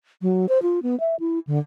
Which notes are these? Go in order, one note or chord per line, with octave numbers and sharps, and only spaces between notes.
F#3
C5
F4
B3
E5
E4
D3